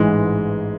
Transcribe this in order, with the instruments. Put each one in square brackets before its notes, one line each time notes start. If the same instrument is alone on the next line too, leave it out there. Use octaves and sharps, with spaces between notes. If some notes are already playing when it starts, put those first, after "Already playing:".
Already playing: [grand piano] A1 G#2 E3 G#3